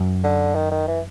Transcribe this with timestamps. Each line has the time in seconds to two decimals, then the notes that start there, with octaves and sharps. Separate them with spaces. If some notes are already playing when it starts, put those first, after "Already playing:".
Already playing: F#2
0.24 D3
0.55 D#3
0.71 D#3
0.88 E3